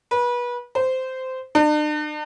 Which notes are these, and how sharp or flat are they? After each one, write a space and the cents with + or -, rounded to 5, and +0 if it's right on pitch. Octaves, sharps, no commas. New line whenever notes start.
B4 -30
C5 -15
D4 +45